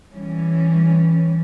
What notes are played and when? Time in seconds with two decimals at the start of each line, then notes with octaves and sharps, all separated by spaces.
0.13 E3 G3 C#4